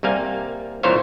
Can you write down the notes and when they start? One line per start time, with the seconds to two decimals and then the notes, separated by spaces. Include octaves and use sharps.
0.03 C2 G3 A#3 F5 G#5
0.83 C2 A#2 E3 C5 C#5 F5